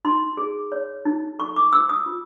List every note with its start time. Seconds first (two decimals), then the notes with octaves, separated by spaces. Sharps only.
0.05 D#4 C6
0.37 G#4
0.72 C#5
1.05 D#4
1.39 A4 C#6
1.56 D6
1.73 C5 E6
1.89 D#6
2.06 F4